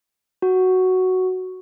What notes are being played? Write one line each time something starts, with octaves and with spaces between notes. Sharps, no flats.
F#4